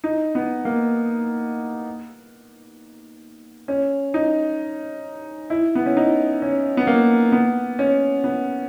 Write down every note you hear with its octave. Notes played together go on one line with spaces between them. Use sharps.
D#4
B3
A#3
C#4
D#4
E4
B3
C#4
D#4
C#4
B3
A#3
B3
C#4
B3